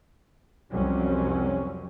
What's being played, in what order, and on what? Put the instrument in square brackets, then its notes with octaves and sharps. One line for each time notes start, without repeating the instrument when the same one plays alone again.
[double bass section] C2 F2 F#3 G3 C4 C#4